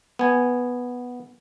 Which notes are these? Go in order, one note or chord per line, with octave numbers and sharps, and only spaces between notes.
B3 G#5